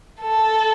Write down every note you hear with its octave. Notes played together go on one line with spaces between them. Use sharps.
A4